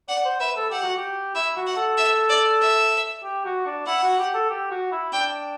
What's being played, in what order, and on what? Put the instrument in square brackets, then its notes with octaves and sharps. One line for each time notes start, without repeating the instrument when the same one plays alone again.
[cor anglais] D5 [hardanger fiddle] F#5
[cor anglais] C5
[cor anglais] B4 [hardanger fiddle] E5
[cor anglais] A4
[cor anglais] G4 [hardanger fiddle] F#5
[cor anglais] F#4
G4
[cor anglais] E4 [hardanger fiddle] E5
[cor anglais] F#4
[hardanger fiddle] F#5
[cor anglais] A4
[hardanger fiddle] E5
D5
E5
[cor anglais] G4
F#4
D4
[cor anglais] E4 [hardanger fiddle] F#5
[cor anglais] F#4
G4
A4
G4
F#4
E4
[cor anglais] D4 [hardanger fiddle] G5